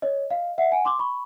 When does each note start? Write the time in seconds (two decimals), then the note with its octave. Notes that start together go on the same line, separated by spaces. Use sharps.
0.02 C#5 D#5
0.30 D#5 F5
0.58 E5 F#5
0.72 F#5 G#5
0.85 C6 D6
0.99 B5 C#6